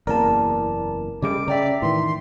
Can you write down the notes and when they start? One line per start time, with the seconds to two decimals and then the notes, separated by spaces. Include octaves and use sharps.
0.07 F#1 E2 A#3 A#4 D5 A5
1.22 C#3 G3 A3 D#5 D6 D7
1.48 C#3 D5 E5 G5 A#5
1.82 A2 D#3 E3 C6